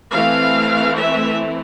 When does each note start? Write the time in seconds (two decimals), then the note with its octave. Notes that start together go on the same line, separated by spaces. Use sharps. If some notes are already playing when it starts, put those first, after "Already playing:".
0.14 E3 A3 C4 F5
0.97 E5